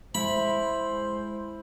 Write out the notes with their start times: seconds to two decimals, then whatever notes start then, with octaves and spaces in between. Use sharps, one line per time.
0.15 G#3 E4 C5 B5